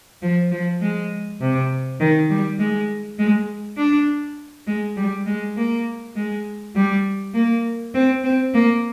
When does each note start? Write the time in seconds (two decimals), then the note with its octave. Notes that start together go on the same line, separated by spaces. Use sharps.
0.22 F3
0.51 F3
0.81 G#3
1.41 C3
2.01 D#3
2.30 G3
2.59 G#3
3.19 G#3
3.78 D4
4.67 G#3
4.97 G3
5.26 G#3
5.57 A#3
6.16 G#3
6.76 G3
7.35 A#3
7.94 C4
8.24 C4
8.54 A#3